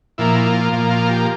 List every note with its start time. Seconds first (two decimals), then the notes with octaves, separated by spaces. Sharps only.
0.18 A#2 F3 A#3 E4
0.46 F4
0.72 A#2 F3 A#3
0.90 F4
1.09 G4